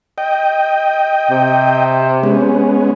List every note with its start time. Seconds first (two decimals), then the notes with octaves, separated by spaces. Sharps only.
0.18 D#5 G5
1.30 C3
2.23 G#3 B3 C#4